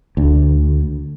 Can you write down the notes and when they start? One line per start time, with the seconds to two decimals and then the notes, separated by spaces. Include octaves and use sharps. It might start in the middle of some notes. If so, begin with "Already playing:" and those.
0.17 D2